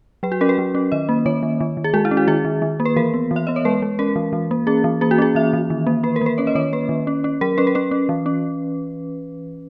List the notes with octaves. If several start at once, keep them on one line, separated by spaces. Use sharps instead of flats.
F#3 B4
F#4
C#4 A#4
B4
F#3
C#4
D#3 D#5
A#3
D#3 C#5
D#3
D#3
D#3
G#4
G#3 F#4
E4
C#4
F#4
D#3 G#4
D#3
D#3
A#3
B4
E3 A#4
B3
E3
E5
B3 D#5
C#5
G#3 B4
G#3
C#4 A#4
E3
E3
A#3
C#4 G#4
E3
A#3 G#4
F#4
C#4 G#4
E3 E5
E3
D#3
A#3
A#3 B4
A#4
A#3 B4
C#4 C#5
D#5
D#3 C#5
A#3 B4
D#3
C#4
C#4
F#3 A#4
C#4 B4
A#4
C#4 B4
C#4
E3
C#4